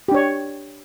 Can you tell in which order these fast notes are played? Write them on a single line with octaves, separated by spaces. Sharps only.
G4 D4 C#5